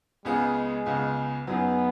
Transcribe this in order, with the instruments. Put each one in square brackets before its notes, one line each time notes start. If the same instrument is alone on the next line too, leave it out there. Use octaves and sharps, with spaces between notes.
[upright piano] C#2 C#3 B3 G#4 [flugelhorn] G#3
[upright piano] C#2 C#3 B3 G#4
[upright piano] F#2 F#3 D#4 G#4 [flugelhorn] B3